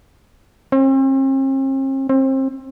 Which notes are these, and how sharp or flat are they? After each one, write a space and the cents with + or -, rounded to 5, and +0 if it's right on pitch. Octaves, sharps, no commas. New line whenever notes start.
C4 +45
C4 +30